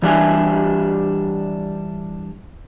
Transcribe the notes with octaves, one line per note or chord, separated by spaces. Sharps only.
E3 G3 D4 G4 E5 G#5